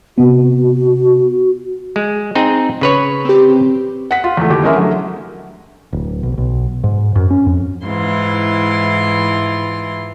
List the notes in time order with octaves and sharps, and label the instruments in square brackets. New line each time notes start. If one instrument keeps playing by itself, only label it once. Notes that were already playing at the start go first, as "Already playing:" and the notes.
[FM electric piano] C3 B3 [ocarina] F#4
[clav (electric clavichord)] G#3
C4 D#4 G#4
C#3 B4 C#5
[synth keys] C4 G4
[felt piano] F#5 B6
F4
E2 A3
D#2 G4
E3 G#3 C#4 A#4 E5
D3 F#3 A3
[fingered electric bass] D1
B1
B1
G#2
F#2
C#4
F2
[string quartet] G#2 E3 E4 F4 C6